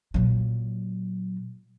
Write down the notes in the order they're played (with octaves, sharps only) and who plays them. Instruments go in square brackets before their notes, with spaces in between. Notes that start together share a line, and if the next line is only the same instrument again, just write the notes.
[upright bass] A#2 F#3